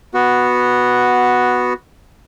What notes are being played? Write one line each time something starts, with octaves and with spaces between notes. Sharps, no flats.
B3 F#4